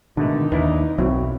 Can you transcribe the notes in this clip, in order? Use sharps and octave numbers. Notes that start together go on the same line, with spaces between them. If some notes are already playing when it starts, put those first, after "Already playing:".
G#2 B2 D3 D#3 A3 D#4
D#2 D4 E4 B4 D5
B1 F#3 C4 E4 F#4